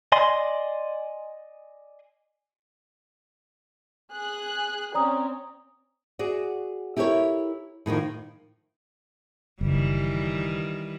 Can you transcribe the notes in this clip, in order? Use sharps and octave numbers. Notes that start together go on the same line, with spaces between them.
D5 D#5 G#5 C6
G#4 F#6
C4 C#4 D5 A#5 D#6
F#4 G#4 D5
E4 G4 A4 A#4 C#5
A2 D#3 F3 A#3
F#1 D#3 E3 G3